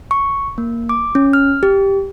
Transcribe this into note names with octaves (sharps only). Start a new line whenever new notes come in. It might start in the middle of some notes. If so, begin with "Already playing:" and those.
C#6
A#3
D6
C#4
F6
G4